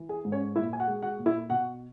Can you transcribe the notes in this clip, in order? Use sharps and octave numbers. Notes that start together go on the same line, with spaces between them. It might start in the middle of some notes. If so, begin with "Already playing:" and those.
Already playing: E3
G#4
G#2
C#4 C#5
A#2 E4 E5
G#5
F#4 F#5
G#3
F#4 F#5
A#2
E4 E5
B2 F#4 F#5